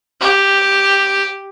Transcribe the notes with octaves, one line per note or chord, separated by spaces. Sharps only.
G4